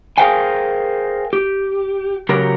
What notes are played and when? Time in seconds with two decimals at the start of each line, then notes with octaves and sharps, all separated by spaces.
0.18 G#4 A#4 C5 F5 G5 G#5
1.33 G4
2.29 C#3 F#3 G4 A#4